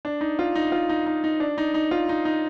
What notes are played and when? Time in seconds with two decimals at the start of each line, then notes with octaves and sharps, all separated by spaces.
0.05 D4
0.21 D#4
0.39 F4
0.55 D#4
0.72 F4
0.89 D#4
1.06 D#4
1.24 D#4
1.40 D4
1.58 D#4
1.74 D#4
1.91 F4
2.09 D#4
2.25 D#4